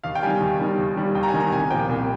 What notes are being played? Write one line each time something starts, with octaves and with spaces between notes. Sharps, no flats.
D#2 F5
G5
D#3 G3 G#5
D#2
D#3 G3
D#2
D#3 G3
D#2 G5
A#5
G#5
D#3 G3
A#5
C2 G#5
A#2 F3 G5
C2